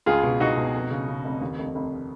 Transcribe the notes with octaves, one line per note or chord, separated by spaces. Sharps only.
C#2 F4 G#4
B2
B2 D#4 F#4
B2
F1
C#3
C#3
F1
D#2
F1
F1